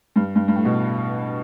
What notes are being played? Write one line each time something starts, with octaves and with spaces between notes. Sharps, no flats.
G2
G2
G2
A2
B2